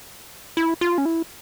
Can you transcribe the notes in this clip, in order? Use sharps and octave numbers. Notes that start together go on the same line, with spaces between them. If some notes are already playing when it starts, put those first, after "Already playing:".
E4
F4
C#4
E4